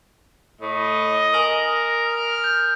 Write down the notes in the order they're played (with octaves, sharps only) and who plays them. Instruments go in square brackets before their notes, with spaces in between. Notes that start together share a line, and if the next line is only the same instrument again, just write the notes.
[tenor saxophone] A2 [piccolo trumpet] D#5
[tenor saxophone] A#4 [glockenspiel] G#5 D#6 F#7
[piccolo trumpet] F6
[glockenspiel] G6